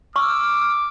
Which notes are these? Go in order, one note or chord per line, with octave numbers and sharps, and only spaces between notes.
C#6 D6 E6 F6